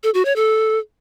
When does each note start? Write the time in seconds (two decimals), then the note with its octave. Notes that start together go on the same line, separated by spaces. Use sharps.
0.03 A4
0.14 F#4
0.25 C#5
0.36 A4